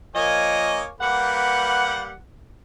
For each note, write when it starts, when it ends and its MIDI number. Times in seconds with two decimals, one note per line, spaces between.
0.16 0.82 46
0.16 0.82 53
0.16 0.88 58
0.16 0.88 73
0.16 0.82 75
0.16 0.88 80
1.00 2.13 55
1.00 2.13 58
1.00 2.13 71
1.00 2.18 78